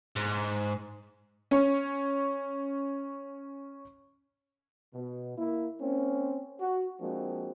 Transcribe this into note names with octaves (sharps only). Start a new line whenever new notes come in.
G#2
C#4 C#5
B2
A#3 E4
A#3 C4 C#4
F#4
F3 G#3 A#3 C4 D4 F#4